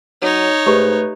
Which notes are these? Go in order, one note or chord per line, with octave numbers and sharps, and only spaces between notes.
F#3 D#4 C#5
G#2 A3 G4 B4 A#5 C#6